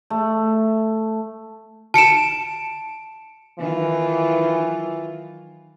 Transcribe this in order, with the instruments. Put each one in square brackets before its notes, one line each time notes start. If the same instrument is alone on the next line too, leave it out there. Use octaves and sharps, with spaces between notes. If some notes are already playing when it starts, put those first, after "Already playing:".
[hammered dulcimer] A3
[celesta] A5 C#7 D7 E7
[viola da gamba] D#3 F#3 F4 [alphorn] E3